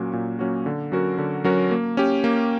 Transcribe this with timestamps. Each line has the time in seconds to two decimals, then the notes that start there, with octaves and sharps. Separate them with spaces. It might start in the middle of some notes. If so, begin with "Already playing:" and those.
Already playing: A#2 F#3 A#3 C#4 F#4
0.13 A#2
0.39 F#3 A#3 C#4 F#4
0.66 D3
0.92 F#3 C#4 F#4 A#4
1.18 D3
1.44 F#3 C#4 F#4 A#4
1.71 A#3
1.97 C#4 G4
2.24 A#3